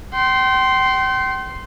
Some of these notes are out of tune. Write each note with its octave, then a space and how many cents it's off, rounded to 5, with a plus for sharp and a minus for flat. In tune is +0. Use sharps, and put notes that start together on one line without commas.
G5 -35 C6 +0